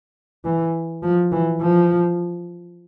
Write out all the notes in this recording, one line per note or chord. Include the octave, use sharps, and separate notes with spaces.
E3
F3
E3
F3